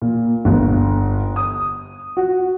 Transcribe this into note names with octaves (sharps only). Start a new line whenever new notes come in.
A#2
G1
D#6
F#4